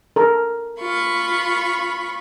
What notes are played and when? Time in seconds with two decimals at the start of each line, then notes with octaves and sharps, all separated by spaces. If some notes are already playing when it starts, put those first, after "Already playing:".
0.16 A4 A#4
0.80 F4 B5 C#6